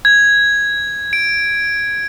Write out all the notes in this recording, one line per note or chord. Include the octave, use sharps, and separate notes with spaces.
G#6
D7